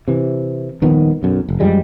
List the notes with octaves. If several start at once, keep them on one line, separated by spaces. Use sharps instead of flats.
C3 E3
D#1 D#3 F3 B3
B1 F#2
F1
F#2 F3 G3 G#3